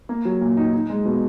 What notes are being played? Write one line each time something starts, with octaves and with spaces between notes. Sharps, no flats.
A#3
F#3
A#2
D#4
D#4
G#3
B2